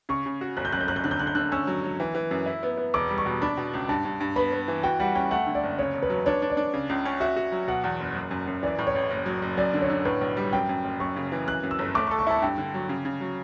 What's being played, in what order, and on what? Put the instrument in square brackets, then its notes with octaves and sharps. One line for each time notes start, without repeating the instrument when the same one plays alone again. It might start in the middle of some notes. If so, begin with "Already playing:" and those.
[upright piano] C#3 [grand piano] C#6
[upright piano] C#3
F#4
[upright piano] G1 [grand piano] F#6
[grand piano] G6
[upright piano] F#2 [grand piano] F#6
[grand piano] G6
[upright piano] G1 [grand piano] F#6
[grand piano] G6
[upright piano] D3 [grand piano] F#6
[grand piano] G6
[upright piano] D3 [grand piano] F#6
[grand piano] G6
[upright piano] D3 [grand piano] F#6
[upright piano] C#4 [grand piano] E6
[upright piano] F#3
F#3
E3
E3
F#2
E4
B3
B3
[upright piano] E1 [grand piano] D6
[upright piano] G3
[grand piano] C#6
[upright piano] B2
[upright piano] D4 [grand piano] B5
[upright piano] B2
C#2
[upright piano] G2 [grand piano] A5
[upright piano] G2
G2
[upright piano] B3 [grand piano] B5
[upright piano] B3
E3
[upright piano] F#4 [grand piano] G5
[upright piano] G3 [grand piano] F#5
[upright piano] C#4 [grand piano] G5
[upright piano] A3 [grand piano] F#5
[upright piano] D3
[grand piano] D5
[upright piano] F#1
[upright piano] C#3 [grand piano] C#5
[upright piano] E1
[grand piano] B4
[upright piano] F#3
[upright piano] D4 [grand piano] C#5
[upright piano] D4
[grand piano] D5
[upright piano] D4
C#3
C#2
C#4
[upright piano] F#4 [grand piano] E5
[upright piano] F#4
F#3
[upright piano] B2 [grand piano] F#5
[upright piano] E2
F#1
F#2
F#2
F#2
[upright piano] E3 [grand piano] D5
[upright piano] A2
[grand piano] C#5
[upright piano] A1
F#1
F#3
F#1
[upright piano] F#2 [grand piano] D5
[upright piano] D3
[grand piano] C#5
[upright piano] D3
[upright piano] A2 [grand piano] B4
[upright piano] B1
G3
[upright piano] F#2 [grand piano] G5
[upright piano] F#2
F#1
[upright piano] F#2 [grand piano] C#6
[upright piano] C#3
E3
[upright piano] F#2 [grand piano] F#6
[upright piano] F#2
[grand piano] E6
[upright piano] G1
[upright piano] A3 [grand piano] D6
[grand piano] C#6
[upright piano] A4
[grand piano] C#6
[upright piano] E4 [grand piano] A5
[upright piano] G2 [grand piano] G5
[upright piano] D3
F#3
C#3
C#3
F#3